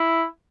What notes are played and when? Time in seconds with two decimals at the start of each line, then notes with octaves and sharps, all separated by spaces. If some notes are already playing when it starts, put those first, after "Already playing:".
Already playing: E4